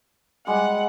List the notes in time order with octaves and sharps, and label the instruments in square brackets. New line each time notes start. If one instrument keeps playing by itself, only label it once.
[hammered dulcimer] G3 G#3 [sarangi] F#5